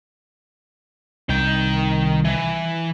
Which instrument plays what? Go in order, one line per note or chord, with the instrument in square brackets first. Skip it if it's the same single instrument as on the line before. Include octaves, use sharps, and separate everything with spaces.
[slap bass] C2 [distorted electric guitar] D#3 G5
[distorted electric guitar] E3